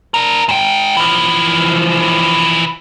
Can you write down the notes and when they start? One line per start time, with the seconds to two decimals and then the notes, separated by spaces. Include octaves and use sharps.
0.14 D4 A#4
0.49 G#2 G5
0.97 E3 F3